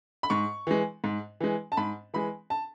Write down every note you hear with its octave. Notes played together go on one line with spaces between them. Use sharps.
B5
G#2 C#6
E3 G#3
G#2
E3 G#3
A5
G#2 B5
E3 G#3 B5
A5